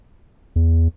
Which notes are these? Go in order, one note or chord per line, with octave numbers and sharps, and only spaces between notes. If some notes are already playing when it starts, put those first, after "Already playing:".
E2